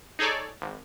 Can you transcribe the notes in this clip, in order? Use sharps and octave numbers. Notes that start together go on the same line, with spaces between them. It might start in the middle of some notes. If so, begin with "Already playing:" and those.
D#4 G#4 A4 C#5 D5
G#1